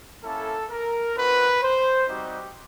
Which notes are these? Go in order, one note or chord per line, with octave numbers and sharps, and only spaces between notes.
A#3 C#4 E4 A4
A#4
C4 D#4 F#4 B4
C5
G3 C4 D#4 F#4 G4